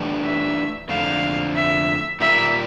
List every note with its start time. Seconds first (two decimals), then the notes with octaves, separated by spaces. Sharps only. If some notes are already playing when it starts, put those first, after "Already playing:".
Already playing: E3 A3 D4 G4
0.24 E5
0.89 F2 D3 A3 F5
1.56 E5
2.20 A#2 G3 A#3 E5